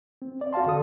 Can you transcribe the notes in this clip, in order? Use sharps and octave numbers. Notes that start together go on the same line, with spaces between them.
C4
D5
F#4 D5 F5 A5 C6
D3 A4 D#6